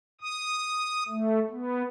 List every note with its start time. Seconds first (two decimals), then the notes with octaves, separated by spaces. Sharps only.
0.21 D#6
1.08 A3
1.50 B3